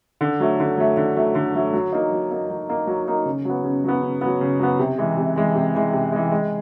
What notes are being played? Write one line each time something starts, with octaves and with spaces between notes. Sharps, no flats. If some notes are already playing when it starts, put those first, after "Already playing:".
D3
F#3 A3
D3
F#3 A3
D3
F#3 A3
D3
F#3 A3
F#3
A#3 D#4
F#3
A#3 D#4
F#3
A#3 D#4
F#3
A#3 D#4
C#3
F#3 B3
C#3
F#3 B3
C#3
F#3 B3
C#3
F#3 B3
C3
E3 G#3
C3
E3 G#3
C3
E3 G#3
C3
E3 G#3
G#3